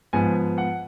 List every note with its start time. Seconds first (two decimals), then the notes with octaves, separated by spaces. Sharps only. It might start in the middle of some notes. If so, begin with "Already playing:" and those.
0.13 G#2 F3 B3 G#5
0.58 F#5